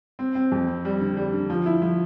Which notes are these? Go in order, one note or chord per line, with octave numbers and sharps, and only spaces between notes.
C4
C4
F2
C4
G3
D3
G3
D3
F3
E4
F3